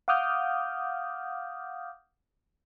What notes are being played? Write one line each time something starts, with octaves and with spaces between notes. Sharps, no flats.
F5 F#5 D6 D#6 F6 G6